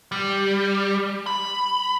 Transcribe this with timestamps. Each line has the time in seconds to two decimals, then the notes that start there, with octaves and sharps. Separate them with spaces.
0.12 G3
1.26 B5